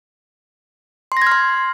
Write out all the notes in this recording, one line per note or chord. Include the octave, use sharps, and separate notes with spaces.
C6
A#6
G#6
F6
C6